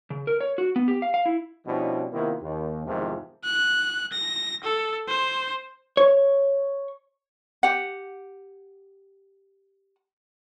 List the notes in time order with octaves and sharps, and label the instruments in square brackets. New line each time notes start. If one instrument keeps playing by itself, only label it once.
[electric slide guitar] C#3
A#4
C#5
F#4
B3
G4
F5
F5
E4
[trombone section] B2 F3 G3 C#4 D4 E4
C3 D#3 A#3 B3 E4 F4
D#2
E2 G#2 C3 D#3 F3
[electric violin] F#6
A#6
A4
C5
[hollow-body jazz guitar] C#5
[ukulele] G4 F#5